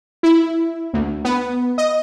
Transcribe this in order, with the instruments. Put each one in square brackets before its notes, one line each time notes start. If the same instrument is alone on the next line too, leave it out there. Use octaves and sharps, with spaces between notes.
[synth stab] E4
D2
B3
D#5